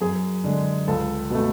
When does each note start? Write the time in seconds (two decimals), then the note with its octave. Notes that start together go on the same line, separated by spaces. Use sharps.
0.01 F#2 G#4
0.44 D3 G#3
0.88 C#2 A4
1.30 B2 A3